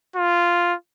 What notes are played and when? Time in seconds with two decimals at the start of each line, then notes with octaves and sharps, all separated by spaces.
0.16 F4